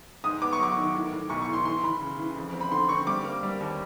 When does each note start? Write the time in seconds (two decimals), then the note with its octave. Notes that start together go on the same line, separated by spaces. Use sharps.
0.24 G#2 D#6
0.42 B3 D6
0.53 C#6
0.59 F#3 D6
0.77 D#3
0.95 A2
1.12 A2
1.30 B1 C#6
1.42 C#6
1.47 E3
1.53 C6
1.65 E3 C6
1.83 E3 B5
2.01 C#3
2.19 E3
2.36 F2
2.54 C4
2.61 B5
2.72 D3 C6
2.89 C4 C#6
3.07 G3 D6
3.24 A#3
3.43 G3
3.60 D#2